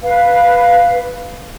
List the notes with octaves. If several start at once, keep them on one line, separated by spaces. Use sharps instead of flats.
B4 F5